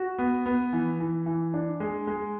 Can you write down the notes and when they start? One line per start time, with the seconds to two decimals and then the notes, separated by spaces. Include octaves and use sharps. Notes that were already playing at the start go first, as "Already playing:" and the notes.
Already playing: F#4
0.19 B3
0.46 B3
0.73 E3
1.00 E3
1.26 E3
1.54 D4
1.80 G#3
2.07 G#3